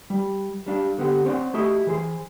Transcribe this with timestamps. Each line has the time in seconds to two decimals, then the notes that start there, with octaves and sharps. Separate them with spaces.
0.10 G3
0.66 G3 D4 F5
0.98 D3 B3 G4 F#5
1.25 C4 C#5 D5 F#5
1.54 A3 E4 F#4 G4 D#5 E5
1.87 E3 G#4 C5